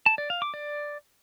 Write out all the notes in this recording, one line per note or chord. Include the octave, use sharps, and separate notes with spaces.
A5
D5
F5
D6
D5